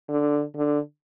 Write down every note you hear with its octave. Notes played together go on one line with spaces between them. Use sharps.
D3
D3